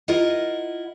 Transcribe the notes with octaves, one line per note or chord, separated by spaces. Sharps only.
E4 F4 A#4 D#5 F#5